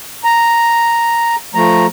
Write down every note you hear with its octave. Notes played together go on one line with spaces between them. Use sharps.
A#5
F3 A3 A#5